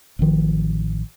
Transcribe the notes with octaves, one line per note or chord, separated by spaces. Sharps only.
A1 A2 D#3 F3